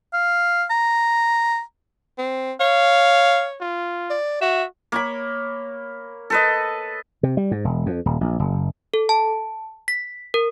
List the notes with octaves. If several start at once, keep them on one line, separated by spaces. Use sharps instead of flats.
F5
A#5
C4
C#5 F5
F4
D5
F#4 E5
A#3 C#5 B5
A4 B4 D#5
C3
G3
G#2
E1
F2
D#1
A#1
F#1
A4
A5
B6
A#4